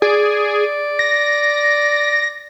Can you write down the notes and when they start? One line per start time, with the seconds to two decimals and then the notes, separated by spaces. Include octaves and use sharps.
0.02 G#4 D5
0.99 A#6